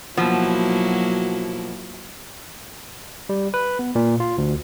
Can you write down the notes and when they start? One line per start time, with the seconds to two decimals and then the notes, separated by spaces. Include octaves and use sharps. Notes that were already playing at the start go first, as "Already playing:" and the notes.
0.17 B2 F3 F#3 A#3 E4
3.29 G3
3.54 B4
3.79 B3
3.95 A#2
4.20 F4
4.38 D2